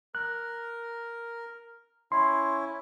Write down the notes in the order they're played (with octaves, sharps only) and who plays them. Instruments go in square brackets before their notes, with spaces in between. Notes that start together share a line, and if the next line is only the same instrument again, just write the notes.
[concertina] A#4 [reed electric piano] F#6
[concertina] C#4 E4 [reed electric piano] C6